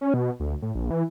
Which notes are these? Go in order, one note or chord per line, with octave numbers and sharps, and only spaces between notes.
C#4
B2
D2
A2
A#1
E3